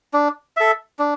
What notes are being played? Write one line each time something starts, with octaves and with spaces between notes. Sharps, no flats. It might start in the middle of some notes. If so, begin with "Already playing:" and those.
D4
A4 E5
D4